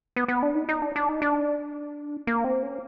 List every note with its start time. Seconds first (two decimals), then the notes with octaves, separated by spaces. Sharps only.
0.16 B3
0.28 B3
0.42 D4
0.55 D#4
0.69 D#4
0.82 D4
0.96 D4
1.09 D#4
1.22 D4
2.27 A#3
2.44 C4
2.63 C#4